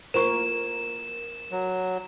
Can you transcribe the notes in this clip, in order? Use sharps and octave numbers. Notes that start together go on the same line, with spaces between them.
A#3 F4 A#4 C5 C#6 E7
F#3